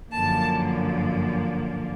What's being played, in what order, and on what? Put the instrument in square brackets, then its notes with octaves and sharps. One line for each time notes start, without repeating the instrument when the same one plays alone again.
[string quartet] F#2 D3 F3 A#3 A5